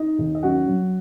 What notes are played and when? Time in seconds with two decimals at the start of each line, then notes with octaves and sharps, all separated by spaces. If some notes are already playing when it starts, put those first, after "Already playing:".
Already playing: D#4 D#5
0.19 D#2
0.35 D#5
0.43 F#2 F#4 F#5
0.68 F#3